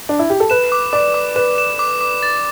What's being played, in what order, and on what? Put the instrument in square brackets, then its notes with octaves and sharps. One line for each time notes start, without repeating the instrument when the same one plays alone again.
[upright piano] D4
E4
G4
A4
[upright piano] B4 [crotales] E7
[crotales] D6
[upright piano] D5 [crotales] D6
[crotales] D6
[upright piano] B4 [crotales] E7
[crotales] E7
D6
D6
A6